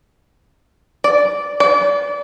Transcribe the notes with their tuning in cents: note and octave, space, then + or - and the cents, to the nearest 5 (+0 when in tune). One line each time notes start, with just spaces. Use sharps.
D5 -10
D5 -30